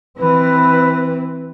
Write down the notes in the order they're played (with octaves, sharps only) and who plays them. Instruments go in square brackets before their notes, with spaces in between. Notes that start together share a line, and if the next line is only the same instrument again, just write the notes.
[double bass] E3 C4 [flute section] B4